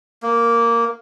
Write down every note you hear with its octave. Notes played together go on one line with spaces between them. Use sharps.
A#3